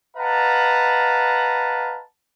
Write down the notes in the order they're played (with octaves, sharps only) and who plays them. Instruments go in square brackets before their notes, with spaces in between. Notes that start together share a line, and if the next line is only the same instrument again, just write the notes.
[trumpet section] B4 D#5 F5 F#5 A5 A#5